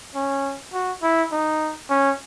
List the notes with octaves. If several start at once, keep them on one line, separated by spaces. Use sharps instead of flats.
C#4
F#4
E4
D#4
C#4